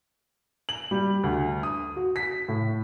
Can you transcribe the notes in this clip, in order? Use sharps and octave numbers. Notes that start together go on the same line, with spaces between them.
F#7
G3
D2
D#6
F#4
B6
A2